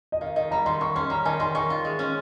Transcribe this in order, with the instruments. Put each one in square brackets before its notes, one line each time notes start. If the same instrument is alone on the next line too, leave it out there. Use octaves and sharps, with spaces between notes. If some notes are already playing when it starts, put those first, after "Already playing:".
[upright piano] D#5
[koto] D#3 [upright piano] F5
[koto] D#3 [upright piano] D#5
[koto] G3 [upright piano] A#5
[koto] D#3 [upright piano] C6
[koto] D#3 [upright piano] C#6
[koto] C#4 [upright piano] C6
[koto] G3 [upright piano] A#5
[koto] D#3 [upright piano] G#5
[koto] D#3 [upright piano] C6
[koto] D#3 [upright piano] C#6
[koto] F4
G#3
C#4